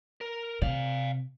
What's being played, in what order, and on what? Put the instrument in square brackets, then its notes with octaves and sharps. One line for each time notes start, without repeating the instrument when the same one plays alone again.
[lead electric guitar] A#4
[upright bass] C3 [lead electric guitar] D5 F5